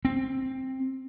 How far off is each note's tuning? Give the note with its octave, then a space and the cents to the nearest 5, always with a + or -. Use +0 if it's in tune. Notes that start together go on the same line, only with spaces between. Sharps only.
C4 +5